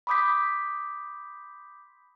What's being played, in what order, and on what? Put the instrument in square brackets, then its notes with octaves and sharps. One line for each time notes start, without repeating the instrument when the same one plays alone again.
[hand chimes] B5 C6 D6 D#6 G6 B6